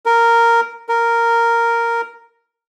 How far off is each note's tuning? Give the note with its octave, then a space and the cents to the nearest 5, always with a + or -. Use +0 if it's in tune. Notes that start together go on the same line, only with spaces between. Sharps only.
A#4 -5
A#4 -5